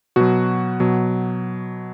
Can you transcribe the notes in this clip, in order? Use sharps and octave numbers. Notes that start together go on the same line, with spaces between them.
B2 F#3 F#4
B2 F#3